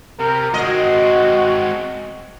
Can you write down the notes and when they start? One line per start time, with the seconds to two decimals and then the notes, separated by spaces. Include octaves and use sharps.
0.20 C3 A#4
0.54 G#3 C4 F#4 D#5